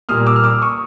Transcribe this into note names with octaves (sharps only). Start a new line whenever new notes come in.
A#2 G3 A#3 D#6 F6
D6 E6
F6
D6 E6
C#6 D#6